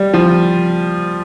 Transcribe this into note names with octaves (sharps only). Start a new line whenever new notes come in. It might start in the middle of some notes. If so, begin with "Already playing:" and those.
Already playing: G3
F3